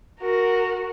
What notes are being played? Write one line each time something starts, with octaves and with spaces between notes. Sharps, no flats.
F#4 A#4